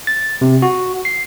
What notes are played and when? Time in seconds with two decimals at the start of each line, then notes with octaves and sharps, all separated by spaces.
0.07 A6
0.41 C3
0.62 F#4
1.05 C7